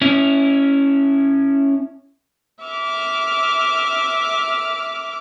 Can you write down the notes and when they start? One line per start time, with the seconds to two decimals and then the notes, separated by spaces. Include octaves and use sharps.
0.01 C#4 E4
2.63 E5 D6 F6